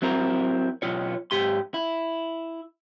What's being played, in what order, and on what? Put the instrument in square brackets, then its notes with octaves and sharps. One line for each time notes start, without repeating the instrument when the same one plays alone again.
[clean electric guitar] F#3 C4 E4 A#4
B1 F4 C#5
G#2 G4 C6
E4